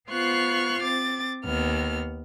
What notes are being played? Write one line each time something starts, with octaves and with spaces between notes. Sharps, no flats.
B3 F4 C5 C#6 F6 F#6
C4 D6 A6
D#2 B3 F6